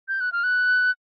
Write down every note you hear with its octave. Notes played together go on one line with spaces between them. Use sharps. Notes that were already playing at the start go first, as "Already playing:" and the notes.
G6
F#6
F6
F#6